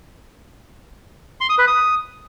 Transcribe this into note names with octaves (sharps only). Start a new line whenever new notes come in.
C6
D#6
B4
D#6